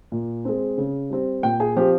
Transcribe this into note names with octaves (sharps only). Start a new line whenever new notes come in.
A#2
G#3 C4
C#3
G3 C4
A#2 G5
G#4
F3 C4 G4